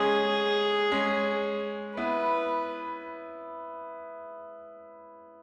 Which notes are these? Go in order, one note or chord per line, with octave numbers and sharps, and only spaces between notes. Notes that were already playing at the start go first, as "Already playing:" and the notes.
Already playing: G#3 C#4 G#4
G#3 C#4
B3 E4 B4